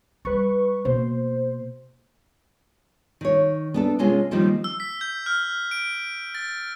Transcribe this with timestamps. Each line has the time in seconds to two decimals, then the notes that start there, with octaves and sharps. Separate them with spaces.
0.25 G3 B4 C#6
0.85 B2 A#3 C5
3.21 D#3 C#5
3.74 B3 D4 A4
3.99 C3 G#3 C#4 F4
4.31 D#3 F3 G3 A#3 C4 D#4
4.64 E6
4.80 B6
5.01 G6
5.26 F6
5.71 D7
6.35 A6